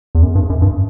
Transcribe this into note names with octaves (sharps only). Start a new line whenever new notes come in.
E2
F#2
G2
F#2
G2